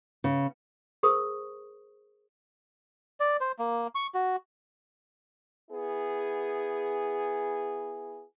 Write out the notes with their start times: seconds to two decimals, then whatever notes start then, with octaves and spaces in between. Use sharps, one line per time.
0.24 C#3
1.03 G#4 A#4 C5 C#6 D#6
3.20 D5
3.41 C5
3.59 A#3
3.95 C#6
4.15 F#4
5.70 B3 E4 G#4